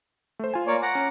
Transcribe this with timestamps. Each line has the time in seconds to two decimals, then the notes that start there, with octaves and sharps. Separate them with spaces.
0.39 A3 C5
0.54 F4 G#5
0.67 A#3 C#5 D5
0.82 F#5 A#5 D6
0.95 C#4